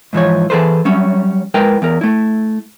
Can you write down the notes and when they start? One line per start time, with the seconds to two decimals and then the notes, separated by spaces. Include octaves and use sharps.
0.13 G#2 E3 F3 C#5
0.50 E3 G#4 A4 B4 C5
0.85 F#3 G3 C#4
1.54 G#3 E4 A#4 B4 G5
1.82 E2 A#4
2.01 A3 E4